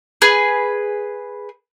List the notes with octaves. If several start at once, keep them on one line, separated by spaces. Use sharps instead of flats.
G#4 B4